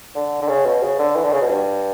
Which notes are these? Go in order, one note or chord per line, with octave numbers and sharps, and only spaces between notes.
D3
D3
C#3
B2
C#3
D3
E3
D3
C#3
B2
G2